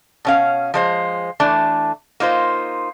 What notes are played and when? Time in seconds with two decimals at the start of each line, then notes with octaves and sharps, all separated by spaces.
0.25 B2 C#4 F5
0.74 F3 G#3 C5
1.40 E3 A3 D4
2.20 A#3 D#4 F4 C5